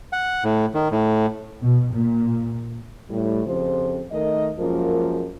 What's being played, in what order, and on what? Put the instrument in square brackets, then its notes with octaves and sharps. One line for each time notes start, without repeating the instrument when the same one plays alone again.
[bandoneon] F#5
A2
D#3
A2
[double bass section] B2
A#2
[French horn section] A2 G3
F2 C#3 F3 G4 C5
D#3 A3 A#4 D#5
F#2 F3 G#3 A#3 F4 A#4